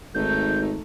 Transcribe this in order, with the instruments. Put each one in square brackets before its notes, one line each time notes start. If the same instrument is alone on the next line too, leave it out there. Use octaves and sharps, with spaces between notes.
[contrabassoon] G#1 [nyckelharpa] A3 D#4 [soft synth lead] G6